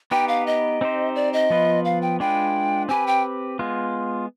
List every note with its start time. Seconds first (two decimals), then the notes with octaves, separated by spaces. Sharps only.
0.11 B3 D#4 G4 B4 G5
0.28 F5
0.47 D#5
0.81 C4 D#4 G4 C5
1.16 D5
1.33 D#5
1.50 F3 B3 F4 B4
1.85 F5
2.02 G5
2.20 G#3 D4 F4 B4 G5
2.89 C4 G4 B4 G#5
3.07 G5
3.59 G#3 B3 F4